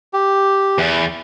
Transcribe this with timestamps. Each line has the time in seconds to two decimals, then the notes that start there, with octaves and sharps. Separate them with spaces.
0.13 G4
0.78 E2